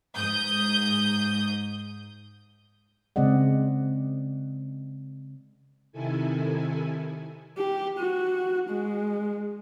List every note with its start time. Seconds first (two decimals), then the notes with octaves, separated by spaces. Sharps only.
0.17 G#2 D#6 G6
3.16 C#3 G#3 C4 D5 D#5 F#5
5.92 C3 D#3 E4 A4 G#5
7.57 G4
7.98 F#4
8.70 G#3